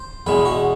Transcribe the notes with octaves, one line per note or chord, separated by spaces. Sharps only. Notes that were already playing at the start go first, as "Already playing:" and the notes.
Already playing: C5
E2 B2 G#3 B4
F#4